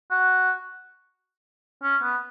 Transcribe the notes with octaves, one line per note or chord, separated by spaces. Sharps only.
F#4
C#4
B3